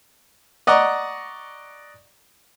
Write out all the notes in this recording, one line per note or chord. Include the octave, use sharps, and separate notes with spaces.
D5 D#5 F#5 A#5 C#6